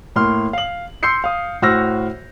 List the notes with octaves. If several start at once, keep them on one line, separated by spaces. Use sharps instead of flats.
A2 A#3 C6 F6
F5 F#7
C6 E6 G6 C7 C#7
F5 D#6
A2 F#4 C5 E6 F6 A#6